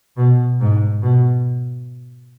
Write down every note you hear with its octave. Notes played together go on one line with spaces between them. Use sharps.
B2
G#2
B2